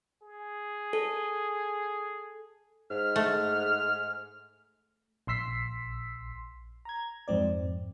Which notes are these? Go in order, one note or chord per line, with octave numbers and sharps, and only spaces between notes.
G#4
A4
G#2 F6
A3
A#1 C6 E6 B6 C7
A#5 G#6
F2 G#2 C4 D5